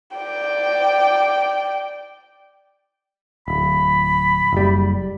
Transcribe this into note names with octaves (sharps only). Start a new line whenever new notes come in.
D5 G5
D1 B5
F#1 G3